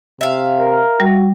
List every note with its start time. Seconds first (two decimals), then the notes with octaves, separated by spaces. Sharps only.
0.21 C3 E5 F5
0.60 A#4
1.00 G3 F#4